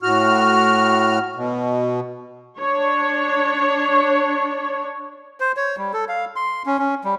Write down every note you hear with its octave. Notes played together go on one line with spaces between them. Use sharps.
A2 F#4 F6
B2
D4 C#5
C5
C#5
G3
A4
F5
C6
C#4
C#4
G3